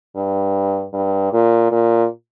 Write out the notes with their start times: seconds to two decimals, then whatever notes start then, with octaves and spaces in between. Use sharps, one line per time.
0.16 G2
0.94 G2
1.33 A#2
1.71 A#2